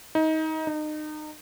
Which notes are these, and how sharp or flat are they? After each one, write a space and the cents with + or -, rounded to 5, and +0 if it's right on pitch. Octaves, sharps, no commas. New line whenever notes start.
D#4 +25
D#4 -30